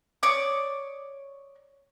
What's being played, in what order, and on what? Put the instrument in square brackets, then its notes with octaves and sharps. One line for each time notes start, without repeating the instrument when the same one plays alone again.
[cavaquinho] C#5 D5 D6 D#6